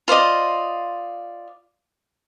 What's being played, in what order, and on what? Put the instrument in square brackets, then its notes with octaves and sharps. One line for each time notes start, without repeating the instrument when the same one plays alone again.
[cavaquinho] F4 C5 D5 D#5